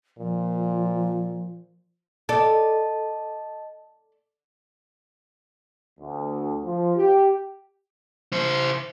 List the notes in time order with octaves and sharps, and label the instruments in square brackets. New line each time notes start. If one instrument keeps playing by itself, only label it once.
[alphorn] A#2 [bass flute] F3
[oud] A4 D5 [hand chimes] D#5 A5
[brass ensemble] D2
F3
G4
[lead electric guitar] E4 C5